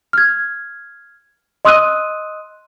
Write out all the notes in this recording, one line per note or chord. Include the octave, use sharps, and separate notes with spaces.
F6 G#6
D#5 C6 D#6 E6 F#6 D#7